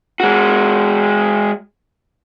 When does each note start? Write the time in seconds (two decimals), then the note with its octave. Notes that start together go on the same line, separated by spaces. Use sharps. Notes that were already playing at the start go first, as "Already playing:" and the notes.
0.20 G#3 F#4